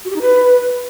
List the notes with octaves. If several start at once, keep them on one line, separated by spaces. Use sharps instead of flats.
F#4
G4
D#4
B4